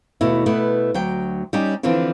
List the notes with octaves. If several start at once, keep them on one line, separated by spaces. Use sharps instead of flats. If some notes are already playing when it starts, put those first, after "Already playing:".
D#2 B2 A3 E4
B2 A3 B3 E4 B4
D2 F#3 G5
G3 C#4 D#4 G4
D3 E3 F3 C4 D4